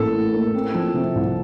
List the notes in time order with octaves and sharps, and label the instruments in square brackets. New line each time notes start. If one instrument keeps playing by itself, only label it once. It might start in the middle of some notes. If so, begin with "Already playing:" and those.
Already playing: [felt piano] A1 A#3 [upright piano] A4
[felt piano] A2
A#3
C4
F3
C3
C2